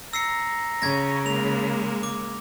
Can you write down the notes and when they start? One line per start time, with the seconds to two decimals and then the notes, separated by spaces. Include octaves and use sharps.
0.13 A#5 E6 C7 C#7
0.82 C#3 C#4 G#6 A#6
1.26 G#3 A#3 F7
2.03 D6